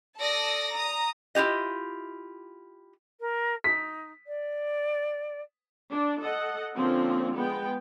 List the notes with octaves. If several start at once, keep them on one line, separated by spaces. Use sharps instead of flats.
A4 D5 A5 D#6 A#6
A#5 D#6
E4 F4 G4 D#5
A#4
D#4 B6
D5
D4
A4 D#5 F#5
D3 F3 A#3 C4 C#4
G#3 B3 G5